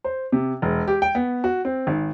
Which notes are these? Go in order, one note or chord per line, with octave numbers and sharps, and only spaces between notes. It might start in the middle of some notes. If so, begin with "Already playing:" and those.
C5
C3
E1
G4
G5
B3
F#4
C4
G#1